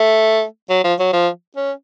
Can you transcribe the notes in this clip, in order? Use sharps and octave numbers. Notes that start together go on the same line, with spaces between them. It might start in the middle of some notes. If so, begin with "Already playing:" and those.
Already playing: A3
F#3
F3
F#3
F3
C#4